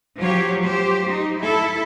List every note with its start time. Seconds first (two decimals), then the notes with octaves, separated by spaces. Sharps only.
0.20 F3 F#3 F4 G4 C#5
0.63 G4 C5
1.08 D#4
1.40 E4 A4